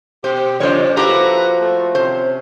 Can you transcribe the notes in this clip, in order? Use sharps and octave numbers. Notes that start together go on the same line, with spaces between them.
B2 G4 C5
F2 A#2 C#3 F3 G3 C5 C#5
F3 A#3 E4 F#4 G4 A4 B4 A#5
A3
C3 C#4 C5